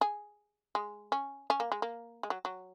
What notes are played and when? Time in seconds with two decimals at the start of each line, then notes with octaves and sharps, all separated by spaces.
0.01 G#4
0.75 G#3
1.12 C#4
1.50 C#4
1.60 A#3
1.72 G#3
1.82 A#3
2.23 G#3
2.30 F#3
2.45 F#3